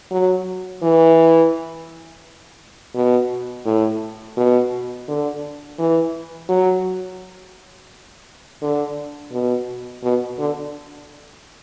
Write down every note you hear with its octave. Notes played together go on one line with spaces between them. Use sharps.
F#3
E3
B2
A2
B2
D3
E3
F#3
D3
B2
B2
D3